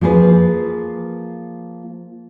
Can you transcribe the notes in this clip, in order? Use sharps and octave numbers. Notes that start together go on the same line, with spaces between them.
F3 A#3 G#4 B4